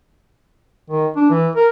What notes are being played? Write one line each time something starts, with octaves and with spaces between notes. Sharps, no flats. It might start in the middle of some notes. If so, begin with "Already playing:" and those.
D#3
D4
E3
A#4